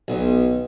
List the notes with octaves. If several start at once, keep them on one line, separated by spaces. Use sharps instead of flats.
B1